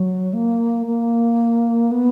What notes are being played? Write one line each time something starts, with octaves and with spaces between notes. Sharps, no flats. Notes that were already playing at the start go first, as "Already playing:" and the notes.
Already playing: F#3
A#3
A#3
B3